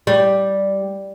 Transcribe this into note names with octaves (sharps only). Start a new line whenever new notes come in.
G3